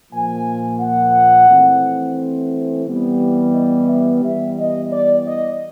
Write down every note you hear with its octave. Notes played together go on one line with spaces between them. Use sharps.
A#2 F3 A#3 G#5
F#5
E3 A3 C4
E3 G3 B3
D#5
E5
E3 G3 B3 E5
D#5
D5
D#5